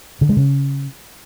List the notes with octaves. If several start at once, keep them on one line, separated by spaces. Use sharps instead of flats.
D3
G#3
C#3